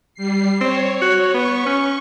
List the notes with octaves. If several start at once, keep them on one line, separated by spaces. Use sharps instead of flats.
G3 C7
C4 C#5
F#4
B3 C#6
C#4